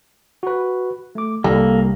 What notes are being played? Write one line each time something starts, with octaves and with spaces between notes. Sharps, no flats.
F#4 B4
A3 D6
C2 G3 A#3 A4